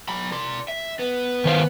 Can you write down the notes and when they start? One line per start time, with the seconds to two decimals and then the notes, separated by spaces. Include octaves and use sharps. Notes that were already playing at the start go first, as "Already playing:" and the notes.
0.09 F#3 B5
0.32 D5 C6
0.68 E5
0.99 B3
1.45 D#3 C5 F5